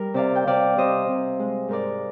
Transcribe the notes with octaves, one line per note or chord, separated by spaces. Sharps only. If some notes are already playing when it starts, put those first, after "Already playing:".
Already playing: G3 A#4
C3 D5 F5
G5
C3 D5 F5
C3 C5 D#5
C3
G#3
G#2 A#4 D5